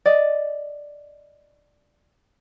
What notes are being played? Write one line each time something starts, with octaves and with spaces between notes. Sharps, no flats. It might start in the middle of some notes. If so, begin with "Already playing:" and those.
D5 D#5